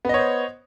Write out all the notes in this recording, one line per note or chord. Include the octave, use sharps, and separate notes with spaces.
B3 C5 C#5 D#5